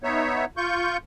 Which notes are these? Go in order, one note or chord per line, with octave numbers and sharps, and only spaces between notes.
B3 D#4 C#5 E5
F4 C#6 G6